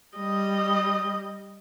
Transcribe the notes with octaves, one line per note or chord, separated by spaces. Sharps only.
G3 D#5